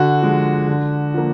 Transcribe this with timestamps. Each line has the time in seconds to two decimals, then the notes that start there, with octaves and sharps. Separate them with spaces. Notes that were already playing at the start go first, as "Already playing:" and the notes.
Already playing: D3 F#4
0.21 F3 G#3
0.68 D3
1.14 F3 A#3